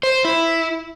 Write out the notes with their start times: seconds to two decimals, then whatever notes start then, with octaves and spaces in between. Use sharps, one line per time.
0.03 C5
0.25 E4